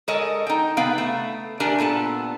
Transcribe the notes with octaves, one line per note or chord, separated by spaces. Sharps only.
G#3 A4 A#4 C#5 D#5
D#4 G5
C3 B3 B4 F5 G5
A3
A3 D4 G4 A#4 G#5
A#2 B3 A4 A5